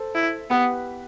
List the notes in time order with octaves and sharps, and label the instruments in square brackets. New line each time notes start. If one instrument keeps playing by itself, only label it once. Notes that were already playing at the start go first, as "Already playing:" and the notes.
Already playing: [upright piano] A4 C5
[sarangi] E4
[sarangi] B3 [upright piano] G4 B4